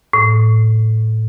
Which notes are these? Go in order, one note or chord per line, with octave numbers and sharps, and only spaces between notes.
A2